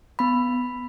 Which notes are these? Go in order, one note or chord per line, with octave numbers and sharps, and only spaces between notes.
B3 B5